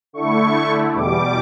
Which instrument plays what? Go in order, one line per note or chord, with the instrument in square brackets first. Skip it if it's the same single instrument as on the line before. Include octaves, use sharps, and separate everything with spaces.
[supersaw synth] D3 A3 E4 C#6
E2 B2 G3 D6